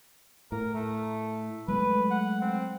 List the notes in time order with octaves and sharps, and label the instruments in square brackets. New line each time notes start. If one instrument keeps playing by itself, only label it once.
[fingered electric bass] A2 [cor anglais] A#4
[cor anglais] A3
[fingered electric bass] F#3 G#3 A3 [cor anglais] B4
[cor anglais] F#5
C4